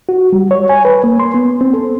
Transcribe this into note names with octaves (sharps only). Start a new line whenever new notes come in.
F#4
G3
C#5
G#5
B4
A#3
C6
B3
C4
A4